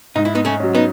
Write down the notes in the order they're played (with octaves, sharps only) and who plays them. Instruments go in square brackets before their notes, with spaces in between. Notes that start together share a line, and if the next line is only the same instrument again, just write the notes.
[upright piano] G#2 [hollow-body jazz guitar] D#4
[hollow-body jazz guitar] E4
B3 D#4
A3 C#4
[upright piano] F#3 C#4
[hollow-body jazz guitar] B3 D#4